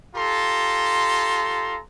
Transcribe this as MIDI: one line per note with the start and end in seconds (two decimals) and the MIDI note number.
0.15 1.80 65
0.15 1.80 67
0.15 1.80 69
0.15 1.80 82
0.15 1.80 84